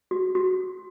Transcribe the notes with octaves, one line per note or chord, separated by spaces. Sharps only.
F#4
F#4